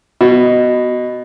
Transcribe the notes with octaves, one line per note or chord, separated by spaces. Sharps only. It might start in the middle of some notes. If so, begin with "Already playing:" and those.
B2